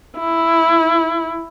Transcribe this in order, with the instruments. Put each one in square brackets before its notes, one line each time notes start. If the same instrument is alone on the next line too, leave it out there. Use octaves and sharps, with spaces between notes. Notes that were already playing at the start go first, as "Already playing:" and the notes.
[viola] E4